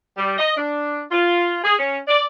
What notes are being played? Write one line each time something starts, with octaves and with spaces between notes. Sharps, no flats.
G3
D#5
D4
F4
G#4
C#4
D5